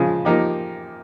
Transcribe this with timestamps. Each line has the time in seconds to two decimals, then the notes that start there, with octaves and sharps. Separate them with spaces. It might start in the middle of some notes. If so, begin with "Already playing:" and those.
Already playing: C#3 F3 G#3
0.25 F3 A#3 D#4 G4